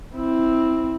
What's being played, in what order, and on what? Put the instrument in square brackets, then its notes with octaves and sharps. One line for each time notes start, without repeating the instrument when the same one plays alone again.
[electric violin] C4 [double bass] E4